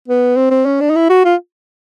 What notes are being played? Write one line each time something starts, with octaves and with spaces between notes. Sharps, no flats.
B3
C4
C4
C#4
D4
D#4
E4
F#4
F4